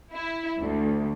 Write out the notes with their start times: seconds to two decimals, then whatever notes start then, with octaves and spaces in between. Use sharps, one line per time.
0.12 E4
0.59 D2